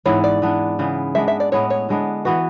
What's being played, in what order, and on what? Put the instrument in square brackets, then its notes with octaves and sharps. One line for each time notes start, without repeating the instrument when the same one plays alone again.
[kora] G#2 E3 B3 E4 [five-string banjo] C#5
[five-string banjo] D5
[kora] E3 B3 D4
C#3 E3 B3
[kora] G#3 B3 D4 [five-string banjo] E5
[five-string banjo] E5
D5
[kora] A2 G#3 B3 E4 [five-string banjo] C#5
[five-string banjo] C#5
[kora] D3 G#3 B3 D4
[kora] E3 B3 F#4 [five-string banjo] B4